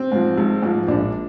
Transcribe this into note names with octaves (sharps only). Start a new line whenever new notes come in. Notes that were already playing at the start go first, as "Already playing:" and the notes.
Already playing: C4
G#2 F3
G#1
G#2 F3
A#1 D4